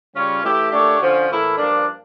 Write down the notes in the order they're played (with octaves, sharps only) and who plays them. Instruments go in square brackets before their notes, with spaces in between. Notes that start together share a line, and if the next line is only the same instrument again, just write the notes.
[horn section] C#3 G3 C#4 F4 C#5
E3 A3 E4 G4
A#2 A3 D4 G4 C#5
D3 F3 C#4
A2 E3 A#3 E4 A4
G2 F3 A#3 D4